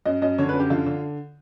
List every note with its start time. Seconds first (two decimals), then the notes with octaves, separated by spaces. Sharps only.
0.05 F#2 D#5
0.22 F#2 D#5
0.38 D3 C#5
0.49 B4
0.54 F#2
0.60 G4
0.70 D3 F4
0.86 D3